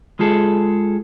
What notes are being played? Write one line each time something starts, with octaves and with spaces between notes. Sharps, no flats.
G#3 F4 G#4 A4